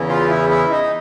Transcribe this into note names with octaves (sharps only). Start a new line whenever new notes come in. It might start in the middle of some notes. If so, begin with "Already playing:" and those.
Already playing: E2 C#3 E3
F4
E4
E4
D#4